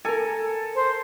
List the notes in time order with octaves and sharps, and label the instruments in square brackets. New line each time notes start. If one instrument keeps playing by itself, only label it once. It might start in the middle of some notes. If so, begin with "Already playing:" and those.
[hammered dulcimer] A4 [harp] A#4 G#5
[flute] C5